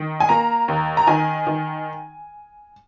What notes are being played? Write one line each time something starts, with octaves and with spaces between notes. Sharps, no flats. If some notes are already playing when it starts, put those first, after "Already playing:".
Already playing: D#3
G#5
A#3 A#5
D#2
A#5
D#3 G#5
D#3